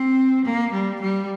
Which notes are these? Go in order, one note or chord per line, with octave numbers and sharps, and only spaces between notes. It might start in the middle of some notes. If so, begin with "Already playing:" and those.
Already playing: C4
A#3
G3
G3